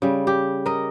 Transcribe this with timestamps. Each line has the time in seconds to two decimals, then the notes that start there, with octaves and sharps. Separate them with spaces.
0.02 C#3 G3
0.27 G4
0.66 A#4 D#5